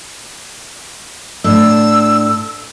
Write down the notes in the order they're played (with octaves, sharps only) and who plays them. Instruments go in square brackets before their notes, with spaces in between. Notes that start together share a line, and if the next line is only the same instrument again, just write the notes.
[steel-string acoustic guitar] A2 D4 [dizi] E6